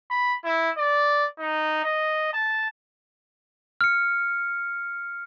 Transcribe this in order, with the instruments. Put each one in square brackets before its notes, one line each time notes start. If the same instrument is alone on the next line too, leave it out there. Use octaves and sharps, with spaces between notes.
[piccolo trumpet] B5
E4
D5
D#4
D#5
A5
[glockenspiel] F6 C#7